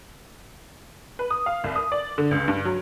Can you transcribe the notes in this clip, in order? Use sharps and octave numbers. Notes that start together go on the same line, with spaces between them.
B4
D#6
F5
C2
D#6
D5
D3
C#2
G2
F#3